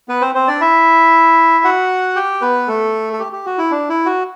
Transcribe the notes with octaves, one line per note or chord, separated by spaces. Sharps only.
B3 B4
C4 C5
C4 C5
D4 D5
E4 E5
F#4 F#5
G4 G5
B3 B4
A3 A4
A4
G4
G4
F#4
E4
D4
E4
F#4